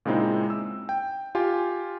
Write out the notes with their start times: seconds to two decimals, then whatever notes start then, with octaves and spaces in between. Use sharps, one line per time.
0.05 A#2 C#3 G#3 C4 D#4 E4
0.50 E6
0.89 G5
1.35 F4 G4 G#5